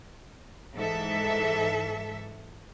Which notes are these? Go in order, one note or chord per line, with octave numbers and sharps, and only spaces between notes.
G#2 E3 A4 E5